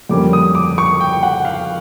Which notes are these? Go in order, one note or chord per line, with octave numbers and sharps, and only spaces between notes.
F2 D3 G3 A#3 C#4 D6
D#6
D6
C#6
G5
F#5
F5